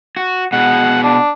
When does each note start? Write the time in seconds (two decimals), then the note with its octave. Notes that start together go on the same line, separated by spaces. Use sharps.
0.17 F#4
0.53 B2 G#3 F#5
1.03 D4